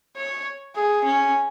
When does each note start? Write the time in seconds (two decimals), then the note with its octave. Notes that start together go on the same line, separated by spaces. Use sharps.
0.16 C#5
0.75 G#4
1.05 C#4